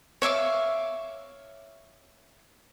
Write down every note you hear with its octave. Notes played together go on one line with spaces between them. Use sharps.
C#5 E5 F5 D6